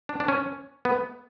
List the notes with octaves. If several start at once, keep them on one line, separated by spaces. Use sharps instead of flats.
D4
D4
C#4
B3